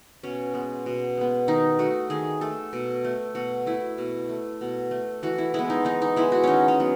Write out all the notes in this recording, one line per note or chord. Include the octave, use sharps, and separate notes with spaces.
B2 C#4
G#3 B3
B2
G#3 B3
D#3 D#4
A3 F#4
D#3 G#4
A3 A4
B2
A3
B2 F#4
A3 E4
B2
A3
B2
A3
E3 F#4
E4
G#3 B3 E4
D#4
E3 D#4
D#4
G#3 B3 E4
F#4
D#3 C#4 D#4
C#4
F#3 B3